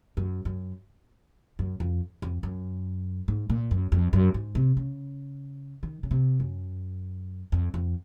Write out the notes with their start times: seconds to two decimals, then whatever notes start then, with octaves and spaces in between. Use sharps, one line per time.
0.17 F#2
0.45 F#2
1.59 F#2
1.80 F2
2.22 F2
2.43 F#2
3.28 G#2
3.50 A#2
3.71 F#2
3.92 F2
4.13 F#2
4.34 G#2
4.55 C3
4.77 C#3
5.83 D#3
6.03 C#3
6.11 C3
6.40 F#2
7.52 F2
7.74 F2